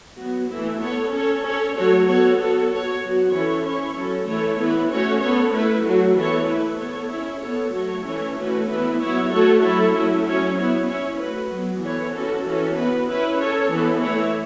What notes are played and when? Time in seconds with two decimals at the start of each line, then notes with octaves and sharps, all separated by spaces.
0.17 F#3 B3 F#4
0.49 E3 A3 E4
0.80 B3 A4 C#5
1.11 C#4 A4 C#5
1.43 C#4 A4 C#5
1.75 F#3 A3 F#4 A4 C#5
2.07 B3 F#4 A4 C#5
2.37 B3 F#4 A4 C#5
2.68 B3 F#4 C#5
3.01 F#3 B3 F#4
3.32 E3 C#4 E4 A4 C#5
3.63 C#4 E4 C#5
3.95 F#3 C#4 A4
4.26 E3 A3 E4 A4 C#5
4.57 E3 B3 E4 B4
4.90 A3 C#4 F#4 C#5
5.20 B3 A4 C#5
5.53 A3 E4 B4
5.83 F#3 A3 F#4
6.15 E3 B3 A4 C#5
6.47 A3 E4 B4
6.78 B3 A4 C#5
7.09 C#4 E4 C#5
7.41 B3 A4 C#5
7.72 F#3 A3 F#4 C#5
8.04 E3 A3 C#4 E4 C#5
8.36 E3 A3 C#4 F#4 B4
8.67 E3 B3 E4 B4
8.99 F#3 B3 E4 C#5
9.30 A3 F#4 A4 C#5
9.61 F#3 A3 E4 A4 C#5
9.92 F#3 A3 C#4 E4
10.24 F#3 C#4 E4 C#5
10.55 B3 E4 C#5
10.87 C#4 E4 C#5
11.19 A3 F#4 B4
11.50 F#3 B3 F#4
11.82 E3 B3 A4 C#5
12.13 C#4 F#4 A4
12.45 E3 C#4 F#4 A4
12.76 B3 F#4 B4
13.07 C#4 E4 B4
13.38 C#4 A4 C#5
13.71 E3 B3 A4
14.01 E3 A3 E4 C#5